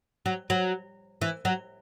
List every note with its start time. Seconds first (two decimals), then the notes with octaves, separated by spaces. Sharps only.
0.26 F#3
0.50 F#3
1.22 E3
1.45 F#3